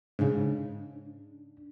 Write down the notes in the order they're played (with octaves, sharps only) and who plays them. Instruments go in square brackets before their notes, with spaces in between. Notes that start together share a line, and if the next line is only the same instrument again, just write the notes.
[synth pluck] G#2 C#3 [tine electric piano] D4